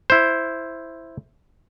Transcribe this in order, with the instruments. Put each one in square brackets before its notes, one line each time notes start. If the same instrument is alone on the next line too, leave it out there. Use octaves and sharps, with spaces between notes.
[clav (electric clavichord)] E4 C5